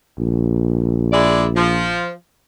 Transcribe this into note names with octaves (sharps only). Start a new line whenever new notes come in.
A#1
G#3 E4 D5
F3